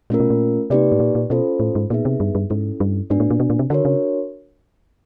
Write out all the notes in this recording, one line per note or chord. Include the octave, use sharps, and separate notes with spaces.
A#2 A3 C#4 F4 A#4
B2
A#2
C3 A#3 D#4 G4 B4 D5
A2
A#2
A#2
B2 C#4 F4 A4 C5
A2
G#2
A#2 B3 D#4 G#4 B4 E5
C3
G2
G2
G#2 C#4 E4 A4
G2
G#2 B3 D4 F#4 B4 D5
A2
A#2
B2
A#2
C3
D3 D4 F#4 A#4 C#5
C#3